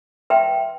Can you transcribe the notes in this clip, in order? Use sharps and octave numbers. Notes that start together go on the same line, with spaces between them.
B4 E5 G5 C6